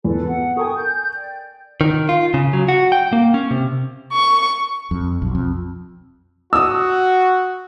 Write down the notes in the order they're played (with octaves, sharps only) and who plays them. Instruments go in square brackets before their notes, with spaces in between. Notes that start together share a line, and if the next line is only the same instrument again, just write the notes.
[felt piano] E2 [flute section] A4 B4
[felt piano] B3 [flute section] F#5
[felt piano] A4 A#4 G#5 [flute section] G5 C#6 D#6
[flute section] G6
D5 G5
[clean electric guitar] D#3
F4
C#3
F#3
F#4
G5
A#3
C#4
C3
[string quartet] C#6
[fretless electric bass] F2
B1
F2
[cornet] F#4 [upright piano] D#6 E6